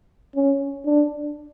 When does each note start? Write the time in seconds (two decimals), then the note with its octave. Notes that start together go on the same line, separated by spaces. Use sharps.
0.35 C#4
0.86 D4